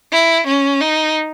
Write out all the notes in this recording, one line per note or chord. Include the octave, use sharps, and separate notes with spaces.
E4
C#4
D#4